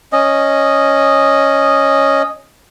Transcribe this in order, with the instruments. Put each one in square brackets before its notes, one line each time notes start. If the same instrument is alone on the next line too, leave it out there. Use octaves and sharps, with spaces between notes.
[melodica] C#4 D#5